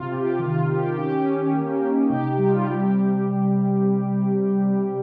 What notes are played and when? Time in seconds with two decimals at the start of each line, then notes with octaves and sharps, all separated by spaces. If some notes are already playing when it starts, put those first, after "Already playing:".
Already playing: C3 F4
0.10 C3 G4
0.39 D#3 F4
0.68 D#3 G4
0.96 C#4 G4
1.24 C#4
1.53 A#3
1.81 D#4
2.10 C3 G4
2.28 G4
2.38 G3
2.47 F4
2.66 C3 G4